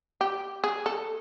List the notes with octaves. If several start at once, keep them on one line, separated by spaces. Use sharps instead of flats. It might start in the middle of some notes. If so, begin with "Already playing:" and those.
G4
G#4
A4